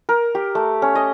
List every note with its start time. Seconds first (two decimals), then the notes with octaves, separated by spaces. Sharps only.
0.09 A#4
0.35 G4
0.55 A3
0.82 C#4
0.95 D#5